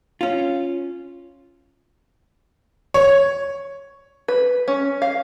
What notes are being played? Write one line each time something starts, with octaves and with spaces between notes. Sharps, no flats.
C#4 F4
C#5
B4
C#4
F5